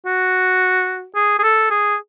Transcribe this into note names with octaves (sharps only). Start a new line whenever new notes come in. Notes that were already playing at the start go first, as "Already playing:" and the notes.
F#4
G#4
G#4
A4
G#4